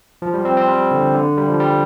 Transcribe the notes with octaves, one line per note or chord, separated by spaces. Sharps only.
F3
G3
C4
C4
G3
D3
D3
G3
F3
G3